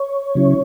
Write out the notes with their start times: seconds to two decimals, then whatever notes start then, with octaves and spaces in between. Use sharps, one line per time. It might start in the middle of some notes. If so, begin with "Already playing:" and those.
Already playing: C#5
0.35 C#3 F#3 C#4 E4